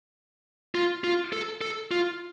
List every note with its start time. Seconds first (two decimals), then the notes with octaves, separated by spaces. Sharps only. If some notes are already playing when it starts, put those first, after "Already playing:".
0.75 F4
1.04 F4
1.33 A4
1.61 A4
1.91 F4